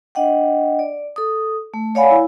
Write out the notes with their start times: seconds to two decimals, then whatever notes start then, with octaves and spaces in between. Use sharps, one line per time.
0.15 D4 D#5 F#5 G5
0.79 D5
1.16 A4 D#6
1.74 A3
1.95 C#5 D5 F5 F#5 G#5 B5
2.11 E4